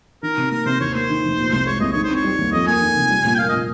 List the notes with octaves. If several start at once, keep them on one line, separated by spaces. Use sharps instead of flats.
D#3 A#4
C3
A#3 A#4
C3 C5
D#2 C#5
A#3 C5
D#3
F1
A#2
C2
G#3 C#5
C2 D#5
D#3 C#5
C5
C4
C#5
G3
D#2
F2 D#5
A#3 G#5
D#3
F1
G3
A#2
G5
A#3 F5
A#2 D#5